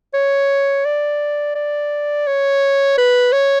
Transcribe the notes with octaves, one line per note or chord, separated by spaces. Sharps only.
C#5
D5
D5
C#5
B4
C#5